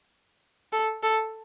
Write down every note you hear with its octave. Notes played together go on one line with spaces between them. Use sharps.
A4
A4